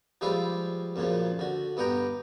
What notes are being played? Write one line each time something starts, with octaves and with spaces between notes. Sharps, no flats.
F3 G3 G#3 B4 E5 F5
F#2 A#2 C#3 F3
D3 F#4
G2 B3 F#5 G5 A#5